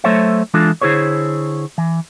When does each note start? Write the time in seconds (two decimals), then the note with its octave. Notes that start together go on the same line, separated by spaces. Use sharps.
0.04 F#3 A3 A4 C5 C#5 E5
0.54 E3 G#3 D4 F4 A4
0.81 D3 E4 G#4 C5 C#5
1.78 E3